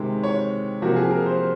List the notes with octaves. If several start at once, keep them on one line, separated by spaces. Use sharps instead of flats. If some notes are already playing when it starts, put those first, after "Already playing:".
Already playing: C3 D#3 G#3 C4
C#5
C3 F3 A#3 F#4
G#4
A#4
C5